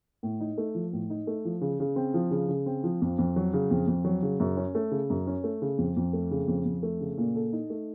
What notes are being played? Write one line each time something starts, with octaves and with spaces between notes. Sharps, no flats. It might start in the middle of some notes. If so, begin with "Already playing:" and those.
A2
D#4
A3
F3
A2
D#4
A3
F3
C#3
C#3
C4
F3
C#3
C#3
C4
F3
F2
F2
F#3
C#3
F2
F2
F#3
C#3
F#2
C#4
A3
C#3
F#2
C#4
A3
C#3
F2
F2
A3
C#3
F2
F2
A3
C#3
A#2
A4
D#4
A3